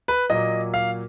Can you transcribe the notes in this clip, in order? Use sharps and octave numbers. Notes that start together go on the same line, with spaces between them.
B4
A#2 F#3 A#3 D#5
F5